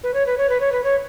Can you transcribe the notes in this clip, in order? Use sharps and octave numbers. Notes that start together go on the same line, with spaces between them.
B4
C#5
B4
C#5
B4
C#5
B4
C#5